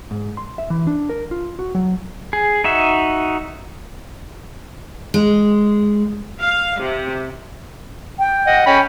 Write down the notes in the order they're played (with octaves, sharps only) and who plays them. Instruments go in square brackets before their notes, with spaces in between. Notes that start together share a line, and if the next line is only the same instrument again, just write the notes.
[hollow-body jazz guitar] G#2
C6
E5
E3
D4
A#4
F4
F#4
F#3
[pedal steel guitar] G#4
D#4 F#4 E5
[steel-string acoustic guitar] G#3
[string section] F5
C3
[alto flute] G5
[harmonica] D#5 F#5
[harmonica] C#4 B5 [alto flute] G5